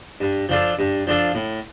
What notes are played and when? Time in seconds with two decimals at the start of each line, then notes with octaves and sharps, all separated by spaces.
0.21 G2
0.49 F3 D4 F4 A4
0.79 G2
1.07 F3 D4 F4 A4
1.35 A2